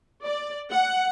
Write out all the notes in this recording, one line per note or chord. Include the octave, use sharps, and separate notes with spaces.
D5
F#5